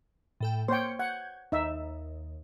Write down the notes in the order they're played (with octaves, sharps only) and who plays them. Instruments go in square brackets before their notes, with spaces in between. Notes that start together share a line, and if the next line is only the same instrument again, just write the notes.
[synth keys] A2 A4 G5
[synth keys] A#3 C#7 [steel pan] C5 C#5 G5
[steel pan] F#5 [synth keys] G6 G#6
[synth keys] D#2 [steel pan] D#4 E5